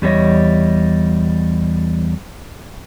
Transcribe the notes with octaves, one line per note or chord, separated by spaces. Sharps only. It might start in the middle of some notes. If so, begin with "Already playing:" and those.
E2 G3 D4 C#5 D#5